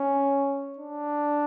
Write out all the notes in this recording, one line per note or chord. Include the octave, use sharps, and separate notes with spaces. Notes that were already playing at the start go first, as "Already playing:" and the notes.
Already playing: C#4
D4